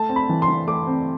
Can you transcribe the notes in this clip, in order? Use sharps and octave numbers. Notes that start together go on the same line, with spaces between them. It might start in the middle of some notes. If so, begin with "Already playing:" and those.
Already playing: A3 A5
C4
B5
E3
C6
E3
A3 D6
C4